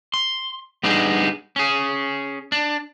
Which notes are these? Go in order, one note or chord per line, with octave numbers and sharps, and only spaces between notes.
C6
G3 B3 D4 D#4 G#4
C#4 G#4
D4